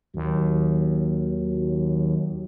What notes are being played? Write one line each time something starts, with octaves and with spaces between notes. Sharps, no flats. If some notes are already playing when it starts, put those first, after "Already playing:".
D#2 F#3